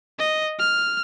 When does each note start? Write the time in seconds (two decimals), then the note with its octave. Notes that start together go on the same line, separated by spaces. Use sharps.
0.19 D#5
0.59 F6